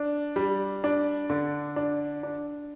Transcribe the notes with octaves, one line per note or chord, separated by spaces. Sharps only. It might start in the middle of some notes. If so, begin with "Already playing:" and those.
Already playing: D4
G3
D4
D3
D4
D4